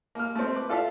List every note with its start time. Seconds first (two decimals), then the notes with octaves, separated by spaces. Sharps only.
0.15 A#3 F6
0.35 A3 C4
0.54 B4 D6
0.69 F4 A4 D5 E5 F5